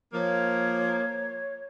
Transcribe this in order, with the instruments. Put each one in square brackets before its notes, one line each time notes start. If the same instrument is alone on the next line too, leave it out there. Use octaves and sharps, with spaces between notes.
[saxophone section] F3 A#3 [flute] C#5